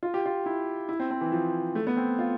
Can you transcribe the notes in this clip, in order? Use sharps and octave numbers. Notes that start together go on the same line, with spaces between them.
F4
G4
F4
E4
E4
C4
C4
E3
F3
A3
B3
C4
F4